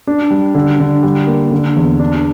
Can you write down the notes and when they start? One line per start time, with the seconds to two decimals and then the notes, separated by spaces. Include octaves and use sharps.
0.07 D4
0.30 G3
0.55 D3
0.80 D3
1.03 G3
1.27 A#3
1.52 D3
1.76 E2
2.00 D4